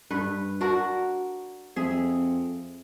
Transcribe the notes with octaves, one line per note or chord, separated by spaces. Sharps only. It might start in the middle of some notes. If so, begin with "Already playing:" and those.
G2 B4
D4 F#4 A#4
F2 G#4 E5